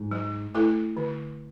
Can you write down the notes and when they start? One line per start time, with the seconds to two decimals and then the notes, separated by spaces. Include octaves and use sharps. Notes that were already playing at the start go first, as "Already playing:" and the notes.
Already playing: G#2
0.11 F#3
0.54 A3 E4 A4
0.97 D3